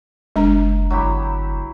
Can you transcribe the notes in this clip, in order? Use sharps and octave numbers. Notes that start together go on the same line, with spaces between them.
F#1 G#3 D4 A#5
G1 F#3 E4 G4